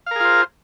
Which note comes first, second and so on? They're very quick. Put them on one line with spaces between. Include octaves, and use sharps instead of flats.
F5 A#4 G#4 F4 C5